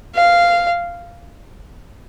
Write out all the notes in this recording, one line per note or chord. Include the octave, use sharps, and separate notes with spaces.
F5